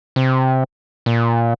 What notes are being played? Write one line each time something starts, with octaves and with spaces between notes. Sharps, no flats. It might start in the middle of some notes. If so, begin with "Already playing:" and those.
C3
A#2